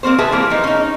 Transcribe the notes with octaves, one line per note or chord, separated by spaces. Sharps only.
A#3 C4 C#4 C5
C3 G#4 B4 E5 A5
E3 G3 A#3
F3 D#4
C#4 D#4